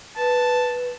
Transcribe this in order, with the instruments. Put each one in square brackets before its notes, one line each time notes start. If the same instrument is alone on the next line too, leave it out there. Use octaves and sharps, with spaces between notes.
[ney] B4 [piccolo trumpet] A5